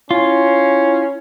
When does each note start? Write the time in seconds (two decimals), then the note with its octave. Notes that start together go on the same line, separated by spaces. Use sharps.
0.11 C#4 E4 F4